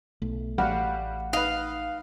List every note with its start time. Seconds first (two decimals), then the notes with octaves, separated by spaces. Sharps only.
0.22 B1 A3
0.58 A1 G3 F#4 F5 F#5 F6
1.33 D#4 B4 D#5 F5